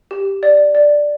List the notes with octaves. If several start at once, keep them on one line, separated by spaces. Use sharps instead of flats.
G4
D5
D5